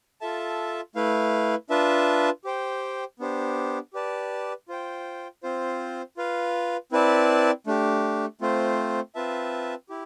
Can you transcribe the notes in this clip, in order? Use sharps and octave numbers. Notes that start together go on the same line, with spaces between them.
F4 A4 E5 A5
A3 E4 B4 F5
D4 F4 B4 E5 A5
G4 C5 G5
B3 D4 G4 C5
G4 B4 D5 A5
F4 C5 G5
C4 F4 C5
F4 B4 F5
C4 E4 B4 D5 A5
A3 D4 G4
A3 C4 F4 C5
C4 F4 B4 E5 A5
E4 G4